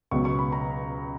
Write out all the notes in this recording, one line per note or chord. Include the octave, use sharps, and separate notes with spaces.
C#2 B2 F#3 B3 C#6
C#6
B5
A#5